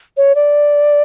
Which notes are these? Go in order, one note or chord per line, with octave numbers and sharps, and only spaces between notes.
C#5
D5